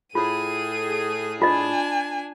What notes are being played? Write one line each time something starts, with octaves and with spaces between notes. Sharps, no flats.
A2 F4 G#4 D#7
D4 F4 D#5 G#5